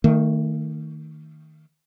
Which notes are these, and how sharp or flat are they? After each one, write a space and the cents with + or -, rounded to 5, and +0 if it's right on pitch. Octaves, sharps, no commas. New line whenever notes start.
D#3 +0 A3 +35